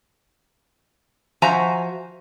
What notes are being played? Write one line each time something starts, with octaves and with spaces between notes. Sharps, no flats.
F3 F#4 C5 E5 G#5 A#5